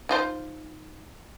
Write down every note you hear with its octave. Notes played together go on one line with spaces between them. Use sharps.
D#4 F4 C5